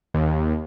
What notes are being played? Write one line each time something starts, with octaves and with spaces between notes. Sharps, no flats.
D#2